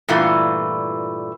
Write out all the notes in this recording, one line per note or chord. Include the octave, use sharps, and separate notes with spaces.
G2 A#2 E3 A3 F4